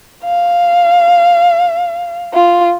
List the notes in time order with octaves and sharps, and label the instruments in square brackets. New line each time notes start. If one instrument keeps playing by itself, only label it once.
[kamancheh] F5
F4